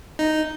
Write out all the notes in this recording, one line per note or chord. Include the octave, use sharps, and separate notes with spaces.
D#4